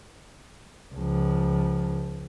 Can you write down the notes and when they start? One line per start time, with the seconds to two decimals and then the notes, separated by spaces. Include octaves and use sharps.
0.95 C#2 F3